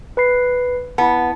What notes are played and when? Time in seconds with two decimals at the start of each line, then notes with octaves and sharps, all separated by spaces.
0.17 B4 B5 C7
0.98 B3 E4 A5